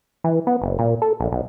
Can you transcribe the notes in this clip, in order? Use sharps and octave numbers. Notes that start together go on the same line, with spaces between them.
E3
B3
F#1
A#2
A4
A#1
B1